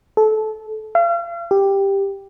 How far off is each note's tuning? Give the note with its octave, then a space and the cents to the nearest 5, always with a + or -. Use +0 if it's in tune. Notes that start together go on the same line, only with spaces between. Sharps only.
A4 -20
F5 -40
G4 +5